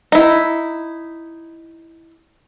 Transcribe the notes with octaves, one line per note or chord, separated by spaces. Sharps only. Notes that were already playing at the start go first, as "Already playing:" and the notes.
D#4 E4